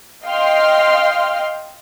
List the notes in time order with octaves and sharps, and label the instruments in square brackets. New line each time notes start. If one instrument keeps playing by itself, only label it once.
[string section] D#5 F5 G5 C6 F6